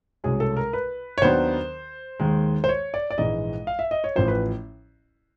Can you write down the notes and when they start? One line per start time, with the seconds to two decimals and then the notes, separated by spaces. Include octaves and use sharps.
0.24 C2 B2 G#3 C#4 G#4
0.40 A4
0.57 A#4
0.73 B4
1.18 C#5
1.22 D#2 D#3 F#3 B3 D4 C5
2.20 D#2 D#3 G#3
2.64 C5
2.69 C#5
2.94 D5
3.11 D5
3.18 A#1 G#2 E3 G#3 D#5
3.67 F5
3.79 E5
3.91 D#5
4.04 C#5
4.15 A1 A2 F3 C5
4.28 B4